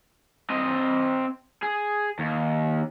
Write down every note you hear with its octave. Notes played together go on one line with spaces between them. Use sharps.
C4 D#5
G#4
D#2